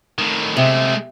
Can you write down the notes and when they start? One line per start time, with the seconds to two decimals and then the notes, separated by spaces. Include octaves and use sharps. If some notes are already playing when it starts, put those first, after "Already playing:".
0.19 A2 D#3
0.57 C3 G#3 A3